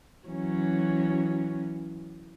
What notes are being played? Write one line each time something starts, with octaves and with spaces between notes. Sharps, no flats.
E3 F#3 C#4